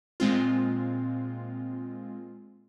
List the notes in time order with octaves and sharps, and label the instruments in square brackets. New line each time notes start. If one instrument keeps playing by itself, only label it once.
[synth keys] A#2 G#3 C4 F4